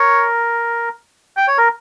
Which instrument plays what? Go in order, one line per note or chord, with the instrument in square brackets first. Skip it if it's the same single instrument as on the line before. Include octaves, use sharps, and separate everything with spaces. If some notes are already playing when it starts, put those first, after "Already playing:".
Already playing: [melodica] A#4 [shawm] C#5
[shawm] G5
[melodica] C#5
A#4